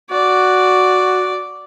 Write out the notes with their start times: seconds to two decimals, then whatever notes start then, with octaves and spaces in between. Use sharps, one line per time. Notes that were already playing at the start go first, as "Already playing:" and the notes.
0.11 F#4 D5